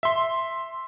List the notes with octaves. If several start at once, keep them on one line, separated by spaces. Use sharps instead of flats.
E5 C6